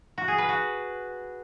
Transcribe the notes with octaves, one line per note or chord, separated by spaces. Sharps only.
F#4
G#4
B4
F#4